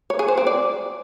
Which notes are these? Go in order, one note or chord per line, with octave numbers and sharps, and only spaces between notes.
C#5
G#4
C5
C4
D5